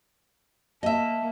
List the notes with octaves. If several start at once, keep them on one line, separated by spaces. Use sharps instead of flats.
A#3 D#5 E5 A5